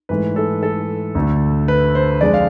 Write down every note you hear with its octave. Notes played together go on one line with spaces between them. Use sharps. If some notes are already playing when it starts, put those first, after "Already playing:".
G#2 E3 A3 B4
A4
A4
D2 D3 A3
B4
C5
F2 D3 G#3 D5
F5